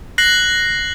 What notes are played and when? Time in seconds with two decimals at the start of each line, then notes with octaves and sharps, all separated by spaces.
0.18 F#6 A#6 C7 F#7